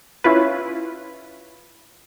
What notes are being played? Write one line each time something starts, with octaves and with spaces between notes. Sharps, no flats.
C#4 E4 F4 B4